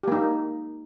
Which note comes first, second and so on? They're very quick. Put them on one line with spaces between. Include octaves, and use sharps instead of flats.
G4 A#3 D#4